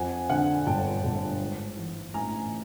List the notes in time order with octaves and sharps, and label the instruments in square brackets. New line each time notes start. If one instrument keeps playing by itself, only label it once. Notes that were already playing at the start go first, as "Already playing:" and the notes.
Already playing: [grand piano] F2 [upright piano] F#5 G#5
[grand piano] D3 [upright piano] F#5 G#5
[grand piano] G1 [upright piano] G5 A5
[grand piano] G1
G#2
E3
[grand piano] A1 [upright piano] G#5 A#5